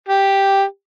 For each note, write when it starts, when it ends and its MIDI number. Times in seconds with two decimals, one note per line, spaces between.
0.08 0.63 67